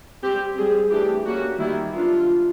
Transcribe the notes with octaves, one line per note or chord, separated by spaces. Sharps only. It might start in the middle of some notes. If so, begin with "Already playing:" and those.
G3 C4 G4
G3 C4 G#4
E3 A3 D4 G4
G3 A#3 C#4 F#4
D#3 G3 A#3 E4
F#3 B3 D4 F4